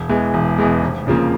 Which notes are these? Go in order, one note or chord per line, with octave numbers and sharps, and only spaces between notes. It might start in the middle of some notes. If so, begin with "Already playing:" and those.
Already playing: E1
E2 E3 G#3
E1
E2 E3 G#3
F1
F2 C#3 F3 A#3